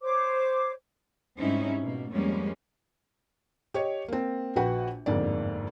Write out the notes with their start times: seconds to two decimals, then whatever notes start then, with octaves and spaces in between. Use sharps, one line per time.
0.02 C5 C#5 D6
1.38 G#2 G3 C4 C#4 D#4 E4
1.81 B2 A#3
2.12 F2 G3 G#3 A#3 B3 C#4
3.74 G4 C#5 D#5
4.08 A#3 C4
4.56 A#1 F#4 B4 F#5 G5
5.06 G1 F2 G#2 A#3 D5